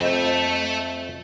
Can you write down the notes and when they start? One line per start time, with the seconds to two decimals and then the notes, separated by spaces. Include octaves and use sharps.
0.01 F2 A3 A4 D#5 G6